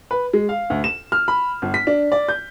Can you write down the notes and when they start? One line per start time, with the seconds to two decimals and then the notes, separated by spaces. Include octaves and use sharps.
0.11 B4
0.33 G#3
0.49 F5
0.70 D2
0.84 E7
1.12 F6
1.28 B5
1.62 G1
1.74 B6
1.87 D4
2.12 D5
2.28 G6